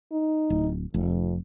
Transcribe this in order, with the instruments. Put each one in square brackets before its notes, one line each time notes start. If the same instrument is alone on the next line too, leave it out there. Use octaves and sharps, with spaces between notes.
[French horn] D#4
[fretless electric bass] D1
[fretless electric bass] F1 [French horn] F2